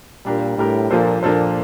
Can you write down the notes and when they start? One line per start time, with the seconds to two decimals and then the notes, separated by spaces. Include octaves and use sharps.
0.25 A#2 G3 D4 G4 A#4
0.58 A2 G3 D4 G4 A#4
0.90 A#2 F3 A#3 D4 A4 C5
1.22 A#2 F3 A#3 D4 A4 C5